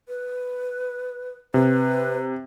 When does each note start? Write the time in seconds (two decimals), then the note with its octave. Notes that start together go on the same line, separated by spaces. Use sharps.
0.09 B4
1.54 C3 B4